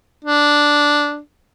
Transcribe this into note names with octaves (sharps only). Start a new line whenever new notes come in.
D4